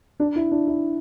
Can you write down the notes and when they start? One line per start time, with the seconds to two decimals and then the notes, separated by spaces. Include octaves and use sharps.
0.20 D4
0.36 E4
0.51 D4
0.67 E4